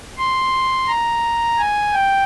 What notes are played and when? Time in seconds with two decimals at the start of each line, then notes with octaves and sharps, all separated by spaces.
0.18 C6
0.88 A#5
1.58 G#5
1.93 G5